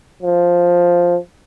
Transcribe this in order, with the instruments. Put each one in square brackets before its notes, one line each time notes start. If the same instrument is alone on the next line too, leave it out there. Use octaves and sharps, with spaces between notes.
[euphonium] F3